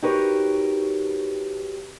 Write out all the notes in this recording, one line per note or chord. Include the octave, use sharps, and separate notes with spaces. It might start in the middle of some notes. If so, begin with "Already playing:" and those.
D#4 F#4 G4 A#4 B4 C#5